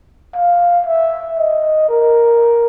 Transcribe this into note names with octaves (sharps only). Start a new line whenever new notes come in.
F5
E5
D#5
A#4